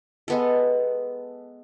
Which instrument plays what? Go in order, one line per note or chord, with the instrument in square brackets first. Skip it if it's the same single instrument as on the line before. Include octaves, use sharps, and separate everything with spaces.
[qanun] G#3 B3 A4